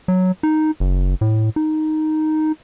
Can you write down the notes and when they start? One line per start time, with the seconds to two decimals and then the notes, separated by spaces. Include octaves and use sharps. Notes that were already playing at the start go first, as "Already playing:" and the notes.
0.08 F#3
0.43 D#4
0.80 F#1
1.21 A2
1.56 D#4